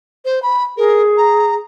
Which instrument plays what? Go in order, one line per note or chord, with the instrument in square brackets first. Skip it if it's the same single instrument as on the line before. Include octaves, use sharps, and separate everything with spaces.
[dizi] C5
B5
[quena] G#4 [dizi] A#4
[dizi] A#5